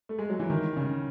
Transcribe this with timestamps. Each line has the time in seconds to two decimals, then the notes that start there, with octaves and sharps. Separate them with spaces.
0.09 A3
0.19 G#3
0.30 F#3
0.39 E3
0.50 D#3
0.77 C#3